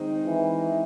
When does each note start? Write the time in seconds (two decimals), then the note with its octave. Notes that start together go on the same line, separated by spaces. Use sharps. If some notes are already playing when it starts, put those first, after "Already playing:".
Already playing: D#3 G#3 C4 D#4
0.27 E3